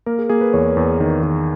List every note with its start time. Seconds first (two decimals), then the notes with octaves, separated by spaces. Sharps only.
0.06 A#3 A#4
0.19 G#4
0.29 A#3 G#4
0.41 B4
0.53 E2 C#5
0.77 E2
1.00 D#3
1.23 D#3